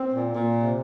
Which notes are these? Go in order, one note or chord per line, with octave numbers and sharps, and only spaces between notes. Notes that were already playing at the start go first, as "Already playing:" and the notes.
Already playing: C4
A#2
A#2
C3